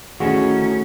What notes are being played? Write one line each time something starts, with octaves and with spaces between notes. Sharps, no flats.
D2 D3 D#3 C#4 E4 F#4 G#4